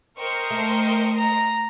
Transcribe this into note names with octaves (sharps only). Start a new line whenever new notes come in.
A#4 C5 D#5 G5 C#6
A3
A#5